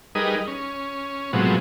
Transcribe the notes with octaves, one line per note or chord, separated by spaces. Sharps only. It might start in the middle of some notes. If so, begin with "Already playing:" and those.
G3 D#4 G#4 A#4 B4 D#5
C#4
A2 C3 F3 F#3 G#3 B3